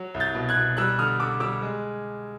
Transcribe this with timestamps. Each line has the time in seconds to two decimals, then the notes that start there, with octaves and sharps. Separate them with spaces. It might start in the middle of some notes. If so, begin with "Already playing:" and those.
Already playing: F#3
0.14 C2
0.20 G6 A6
0.35 B2
0.49 F#6 G#6
0.56 B2
0.77 G3 E6 F#6
0.99 D3 D#6 F6
1.19 D3 D6 E6
1.40 G3 D6 E6
1.62 G#3